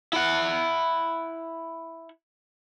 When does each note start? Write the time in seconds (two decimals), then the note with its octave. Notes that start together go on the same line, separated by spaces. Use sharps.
0.13 E4 F#5